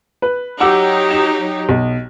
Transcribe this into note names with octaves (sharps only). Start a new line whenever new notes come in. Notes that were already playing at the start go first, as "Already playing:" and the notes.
B4
F#3 D#4 G4 F#5 D6 E6
E7
B1